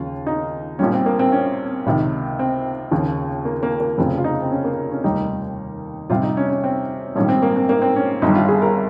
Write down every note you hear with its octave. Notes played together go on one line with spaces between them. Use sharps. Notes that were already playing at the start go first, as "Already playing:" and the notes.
Already playing: D#2 C#3 F3 F4
D#4
A#1 A#2 G3 C#4
C4
A#3
C4
C#4
C#2 C3 D#3
C4
D#2 C#3 F3
A#3
A#3
A#3
F1 F2 C#3 F3 C4
F4
D#4
C4
C#4
A#3
C#4
F1 D#2 D#3 G3 D#4
F2 C3 G3 F4
D#4
C#4
C#4
C4
A#1 G#2 D#3 G3 C#4
C4
A#3
C4
A#3
C4
C#4
G1 G2 D#3 G3 D#4
F4
G#4
A#4